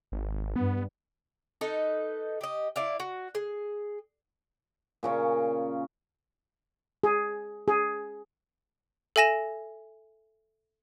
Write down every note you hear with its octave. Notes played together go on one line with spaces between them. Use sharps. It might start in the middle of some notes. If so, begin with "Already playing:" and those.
G#1
G2 B3
D#4 A4 B4
G4 D#5
E4 D5 F5
F#4
G#4
A#2 C#3 C#4
G#4
G#4
A4 E5 G#5 A#6 E7